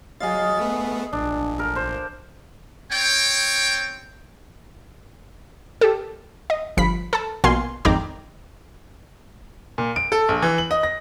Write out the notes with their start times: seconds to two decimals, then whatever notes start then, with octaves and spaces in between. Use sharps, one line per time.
0.20 F#3 G#4 D#5 F5 A6
0.59 A3 B3
1.13 A#1 D4
1.59 A4 A#4
1.76 C5
2.92 C4 C#5 G5
5.81 G4 A4
6.50 D#5
6.77 G1 F3 B5 B6
7.13 A4 A5
7.44 A#1 B2 A#3 F5 G#5 C6
7.85 G#1 F2 D#4 G5 A#5 D6
9.78 A#2
9.96 D7
10.12 A4
10.29 A#1
10.42 E3
10.58 F#7
10.71 D#5
10.83 A#6